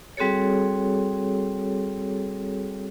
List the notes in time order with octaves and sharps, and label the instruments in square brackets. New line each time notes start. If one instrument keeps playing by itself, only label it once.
[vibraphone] G3 C4 F#4 G#4 A4 C#5